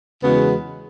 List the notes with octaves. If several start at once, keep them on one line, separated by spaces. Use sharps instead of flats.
E2 C#3 G#3 B3 F#4